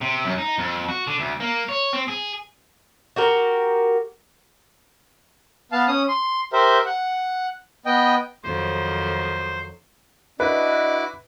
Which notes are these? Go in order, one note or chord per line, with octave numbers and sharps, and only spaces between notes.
C3
F#2
D#4
F2
F#4
D3
D2
A#3
C#5
C4
G#4
F#4 G4 A#4
B3 F5 A5
C#4 D#6
C6
G4 A#4 C5 E5
F#5
B3 D#5 G5
F2 D#3 F#3 C5
D4 E4 F#4 B4 D#5 D6